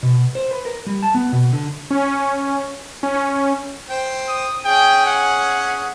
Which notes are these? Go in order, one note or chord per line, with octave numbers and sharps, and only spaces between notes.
B2
C5
B4
A#4
G3
A5
B3
B2
D3
C#4
C#4
C5 G5
D#6
C#4 G#4 G5
F#5